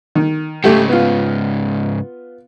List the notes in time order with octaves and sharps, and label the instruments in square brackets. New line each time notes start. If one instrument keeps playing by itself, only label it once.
[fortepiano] D#3
[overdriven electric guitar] G#2 C#3 [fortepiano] A3 G4
[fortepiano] B3 F4